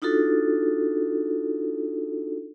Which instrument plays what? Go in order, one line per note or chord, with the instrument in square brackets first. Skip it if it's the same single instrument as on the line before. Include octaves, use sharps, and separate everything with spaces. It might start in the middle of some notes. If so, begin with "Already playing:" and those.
[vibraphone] D4 D#4 F4 F#4 A4